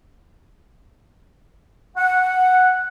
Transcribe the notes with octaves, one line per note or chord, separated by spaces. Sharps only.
F#5